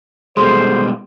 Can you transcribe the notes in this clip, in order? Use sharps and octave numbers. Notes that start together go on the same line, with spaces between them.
B2 G3 G#3 G#4 A4 C5 C6